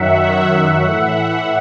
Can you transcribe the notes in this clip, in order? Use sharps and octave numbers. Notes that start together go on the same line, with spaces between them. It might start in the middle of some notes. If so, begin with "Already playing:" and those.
Already playing: F#2 D#3 F#3 E5 F#5
A2 E3 E5 F#5